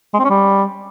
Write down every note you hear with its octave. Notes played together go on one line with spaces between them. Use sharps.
G#3
C4
C#4
G3